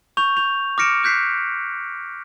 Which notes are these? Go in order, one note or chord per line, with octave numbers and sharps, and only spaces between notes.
C#6 G6 F7
C#6 G6 F7
D6 F6 A#6 C#7 D7 E7
D6 F#6 G6 B6 C7